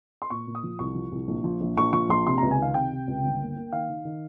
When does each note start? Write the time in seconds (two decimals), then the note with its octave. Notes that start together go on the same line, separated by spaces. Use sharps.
0.22 C6
0.30 A#2 C#6
0.47 A#2
0.55 D#6
0.63 F3
0.79 C2 C#6
0.95 F3
1.12 C2
1.28 A#1
1.44 F3
1.61 A#1
1.77 A#1 C#6
1.93 F3 C#6
2.09 A#1 C6
2.26 C3 C6
2.38 C#2 A#5
2.51 G#5
2.59 D#3 F5
2.74 C3 G5
2.92 C3
3.08 C#2
3.24 G1
3.40 A#3
3.56 A#3
3.72 D#3 F5
3.89 D#3
4.05 D#3